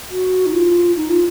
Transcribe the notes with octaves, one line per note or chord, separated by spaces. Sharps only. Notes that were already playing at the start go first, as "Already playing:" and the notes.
F#4
D#4
F4
D#4
F4